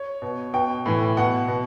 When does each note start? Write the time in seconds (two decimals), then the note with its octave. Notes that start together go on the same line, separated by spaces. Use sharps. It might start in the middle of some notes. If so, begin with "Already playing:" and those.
Already playing: C#5
0.22 B2
0.53 B2 G5
0.86 A2 E3
1.17 B2 F#5
1.48 B2